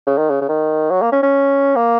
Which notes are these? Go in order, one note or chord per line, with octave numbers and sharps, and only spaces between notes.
C#3
D#3
C#3
C#3
D#3
F#3
A#3
C#4
C#4
A#3